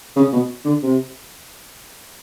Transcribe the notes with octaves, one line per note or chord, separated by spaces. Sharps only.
C#3
B2
D3
C3